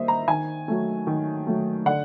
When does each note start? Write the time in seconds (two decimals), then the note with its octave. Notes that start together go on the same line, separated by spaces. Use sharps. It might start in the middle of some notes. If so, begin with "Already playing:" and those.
Already playing: D#3 G3 A#3 C5 D#5 E5
0.08 A#5
0.28 D#3 G#5
0.68 F#3 A3
1.07 D#3
1.47 F#3 A3
1.86 D3 F#5